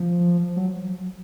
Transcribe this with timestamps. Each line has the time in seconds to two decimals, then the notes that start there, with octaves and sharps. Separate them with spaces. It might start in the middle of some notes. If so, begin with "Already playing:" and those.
Already playing: F3
0.56 F#3